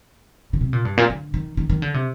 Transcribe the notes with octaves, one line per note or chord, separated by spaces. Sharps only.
D3
C3
A#2
G2
A#2
D3
D#3
D#3
D#3
D3
C3